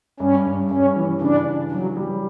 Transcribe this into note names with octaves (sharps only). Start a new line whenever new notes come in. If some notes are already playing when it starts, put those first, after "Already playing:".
G2 C#4
G2
G2 C#4
E3
C#3 D4
D4
F#3 G3
G3